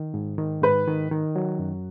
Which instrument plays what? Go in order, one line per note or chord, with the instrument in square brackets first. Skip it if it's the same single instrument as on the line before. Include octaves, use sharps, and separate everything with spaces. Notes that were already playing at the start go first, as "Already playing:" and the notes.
Already playing: [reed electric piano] D#3
G#2
D#3
[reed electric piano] G#2 [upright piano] B4
[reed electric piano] D#3
D#3
F#3
F#2